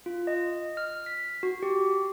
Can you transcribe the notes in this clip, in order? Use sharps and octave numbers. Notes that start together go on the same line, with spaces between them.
F4
D#5
F6
B6
F#4
G4